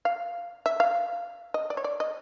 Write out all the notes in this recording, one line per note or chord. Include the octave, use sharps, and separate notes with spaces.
F5
E5
F5
D#5
D5
C#5
D5
D#5